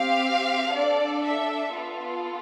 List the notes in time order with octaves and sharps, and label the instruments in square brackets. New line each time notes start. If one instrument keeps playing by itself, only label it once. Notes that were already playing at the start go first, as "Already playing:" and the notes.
Already playing: [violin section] C4 G4 F5
D4 A4 D5
E5
B3 F4 A4